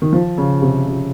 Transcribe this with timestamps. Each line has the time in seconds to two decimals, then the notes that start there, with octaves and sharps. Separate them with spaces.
0.02 D#3
0.13 F3
0.38 C#3
0.62 C3
0.87 C#3